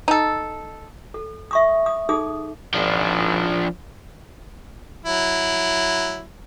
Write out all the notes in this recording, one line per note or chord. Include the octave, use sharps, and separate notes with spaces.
D#4 A4
A4
E5 C#6 D#6
D#6
D#4 G#4 A4 D#6
G#1 F3 D4
F#3 E4